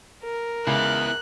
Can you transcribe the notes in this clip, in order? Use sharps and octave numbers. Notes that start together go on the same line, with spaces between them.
A#4
C#2 B3 E4 F#6